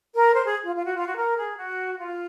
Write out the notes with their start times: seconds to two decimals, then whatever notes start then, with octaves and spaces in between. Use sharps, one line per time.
0.14 A#4
0.34 C5
0.44 G#4
0.65 F4
0.75 F4
0.84 F#4
0.95 F4
1.06 F#4
1.16 A#4
1.36 G#4
1.56 F#4
1.98 F4